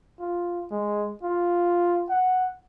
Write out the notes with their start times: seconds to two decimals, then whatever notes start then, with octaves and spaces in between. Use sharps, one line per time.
0.20 F4
0.71 G#3
1.23 F4
2.10 F#5